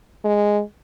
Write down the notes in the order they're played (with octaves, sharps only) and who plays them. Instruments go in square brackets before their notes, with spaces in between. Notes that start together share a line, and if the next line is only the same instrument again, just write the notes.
[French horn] G#3